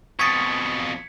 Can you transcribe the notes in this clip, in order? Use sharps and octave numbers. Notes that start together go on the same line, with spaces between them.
F2 B2 C#6 D#6 G#6 A6 B6 C#7